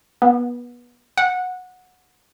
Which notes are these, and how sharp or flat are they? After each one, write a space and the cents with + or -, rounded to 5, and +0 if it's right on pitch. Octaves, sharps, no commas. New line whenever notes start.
B3 -25
F#5 -15